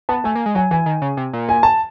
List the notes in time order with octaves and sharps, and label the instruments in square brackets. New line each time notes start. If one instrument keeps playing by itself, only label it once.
[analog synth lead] B3 [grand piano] A5
[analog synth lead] A3 [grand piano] G#5
[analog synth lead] A#3
G#3
[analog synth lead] F#3 [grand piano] G#5
[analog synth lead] E3 [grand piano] G#5
[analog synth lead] D#3
C#3
C3
A#2
[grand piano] G#5
A5